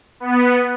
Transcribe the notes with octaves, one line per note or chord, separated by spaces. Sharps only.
B3